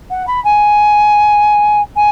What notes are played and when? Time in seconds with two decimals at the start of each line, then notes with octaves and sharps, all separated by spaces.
0.10 F#5
0.27 B5
0.44 G#5
1.96 G#5